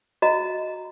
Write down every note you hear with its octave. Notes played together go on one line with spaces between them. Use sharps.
F#4 D#5 A#5